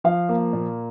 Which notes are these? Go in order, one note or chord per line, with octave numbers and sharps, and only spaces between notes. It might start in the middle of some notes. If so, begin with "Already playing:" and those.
F3 F5
A#3
A#2